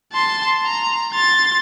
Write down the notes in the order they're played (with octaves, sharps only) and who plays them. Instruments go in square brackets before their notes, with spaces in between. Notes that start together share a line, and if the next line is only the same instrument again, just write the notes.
[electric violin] A5 C6
A#5
C6 A6